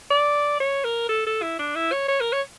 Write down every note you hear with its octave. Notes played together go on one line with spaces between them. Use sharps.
D5
C#5
A#4
A4
A4
E4
D4
E4
C#5
C#5
A#4
C#5